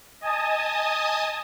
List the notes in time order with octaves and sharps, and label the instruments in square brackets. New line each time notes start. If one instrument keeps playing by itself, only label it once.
[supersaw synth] D#5 G#5 A5 D#6